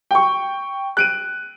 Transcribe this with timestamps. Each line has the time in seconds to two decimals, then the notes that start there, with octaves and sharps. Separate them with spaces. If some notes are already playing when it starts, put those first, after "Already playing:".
0.11 G5 C#6
0.97 F#6 D7 D#7